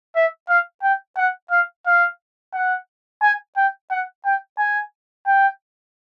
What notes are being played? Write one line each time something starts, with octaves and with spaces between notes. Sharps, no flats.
E5
F5
G5
F#5
F5
F5
F#5
G#5
G5
F#5
G5
G#5
G5